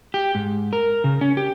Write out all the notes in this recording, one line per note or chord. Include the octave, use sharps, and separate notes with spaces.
G4
G#2
A#4
C#3
C#4
G4